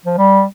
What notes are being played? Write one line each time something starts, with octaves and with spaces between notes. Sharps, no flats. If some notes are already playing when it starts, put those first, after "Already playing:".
F3
G3